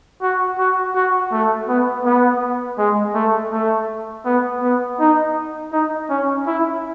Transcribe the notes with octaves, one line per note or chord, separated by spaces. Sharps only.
F#4
F#4
F#4
A3
B3
B3
G#3
A3
A3
B3
B3
D#4
D#4
C#4
E4